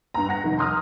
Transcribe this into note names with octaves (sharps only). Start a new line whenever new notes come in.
G2 A#5
F#5 A#6
F1 D#3
A#5 C6 D#6 F6